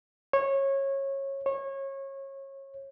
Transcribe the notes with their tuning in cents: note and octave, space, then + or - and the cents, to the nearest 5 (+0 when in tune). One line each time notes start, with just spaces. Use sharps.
C#5 -20
C#5 -25